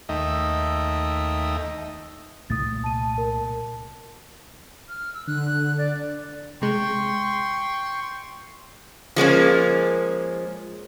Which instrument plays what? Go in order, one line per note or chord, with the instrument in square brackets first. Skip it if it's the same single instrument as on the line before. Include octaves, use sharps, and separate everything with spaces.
[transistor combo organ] D#2 A3 D#4 D#5 E5 G5
[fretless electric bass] C2 A#2 A3 [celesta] D#6 A6
[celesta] A5 D#7
A#4 A5
[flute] F6
E6
[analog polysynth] D3 [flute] F#6
[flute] D5
[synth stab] C3 G#3 [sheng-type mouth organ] G5 C6 C#6
[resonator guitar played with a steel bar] F3 G#3 A#3 C#4